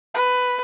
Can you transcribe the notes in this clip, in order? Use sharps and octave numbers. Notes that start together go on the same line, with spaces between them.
B4